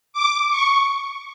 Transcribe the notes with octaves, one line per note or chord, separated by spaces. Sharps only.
D6
C#6